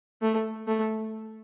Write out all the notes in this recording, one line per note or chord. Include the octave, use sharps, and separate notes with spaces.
A3
A3